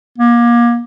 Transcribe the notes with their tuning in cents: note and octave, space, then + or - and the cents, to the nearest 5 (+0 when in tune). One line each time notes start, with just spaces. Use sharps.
A#3 +30